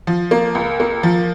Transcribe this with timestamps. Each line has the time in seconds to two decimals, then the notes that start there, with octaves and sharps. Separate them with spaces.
0.07 F3
0.31 A#3
0.55 C#2
0.80 A#3
1.03 F3